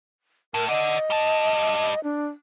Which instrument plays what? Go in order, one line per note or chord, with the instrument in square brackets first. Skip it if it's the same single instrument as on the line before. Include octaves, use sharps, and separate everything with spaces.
[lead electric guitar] A2 [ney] A#4
[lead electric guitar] D5 F#5 [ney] D#5
[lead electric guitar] G3 A5
[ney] D4